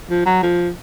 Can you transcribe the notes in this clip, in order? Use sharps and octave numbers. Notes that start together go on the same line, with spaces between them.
F3
F#3
F3